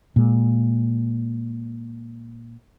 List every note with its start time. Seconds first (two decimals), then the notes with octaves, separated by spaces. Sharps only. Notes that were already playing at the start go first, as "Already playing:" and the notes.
0.16 A#2 G#3